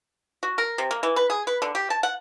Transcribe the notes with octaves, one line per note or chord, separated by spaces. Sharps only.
F#4
A#4
C3
A#3
E3
B4
G#4
B4
D3
G4
A5
F#5